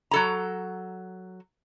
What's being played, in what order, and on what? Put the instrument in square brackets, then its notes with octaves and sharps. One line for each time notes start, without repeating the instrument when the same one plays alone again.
[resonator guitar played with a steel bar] F#3 A4 A#5